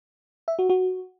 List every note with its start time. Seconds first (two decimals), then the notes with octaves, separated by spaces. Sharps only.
0.48 E5
0.59 F#4
0.69 F#4